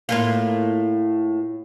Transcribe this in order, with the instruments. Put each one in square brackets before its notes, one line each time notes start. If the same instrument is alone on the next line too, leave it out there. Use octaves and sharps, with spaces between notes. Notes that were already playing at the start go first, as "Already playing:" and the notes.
[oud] A2 A#3 F4